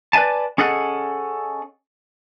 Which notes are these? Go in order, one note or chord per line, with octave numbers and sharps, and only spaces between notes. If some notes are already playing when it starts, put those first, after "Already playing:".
B4 D5 E5 G#5 A5
C#4 G#4 A4 D#5 F#5